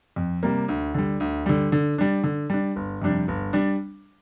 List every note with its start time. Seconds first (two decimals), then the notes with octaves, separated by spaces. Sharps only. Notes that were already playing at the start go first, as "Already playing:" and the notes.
0.16 F2
0.43 C3 G3 A#3
0.68 D2
0.94 D3 G3
1.20 D2
1.46 D3 G3
1.72 D3
1.98 G3 D4
2.23 D3
2.50 G3 D4
2.76 G1
3.02 F2 C3 G3 D4
3.28 G1
3.53 G3 D4